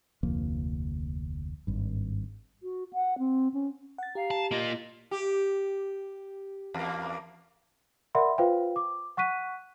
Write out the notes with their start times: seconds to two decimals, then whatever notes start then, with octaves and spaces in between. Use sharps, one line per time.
0.23 F1 D2 F3 A#3
1.67 G#1 G2
2.63 F#4
2.93 F#5
3.19 C4
3.54 C#4
3.98 F#5 A6
4.15 G4 F5 A#5
4.31 A5
4.51 A#3 F4 D#5
5.11 G4
6.74 E2 A#3
8.15 A#4 D5 E5 F#5 B5 C6
8.38 F4 B4 C5 F5 G5
8.76 D6
9.17 F#5 C#6 F#6 B6 D#7